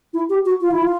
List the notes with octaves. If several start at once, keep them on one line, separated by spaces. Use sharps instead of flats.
E4
G4
F#4
F4
E4
F4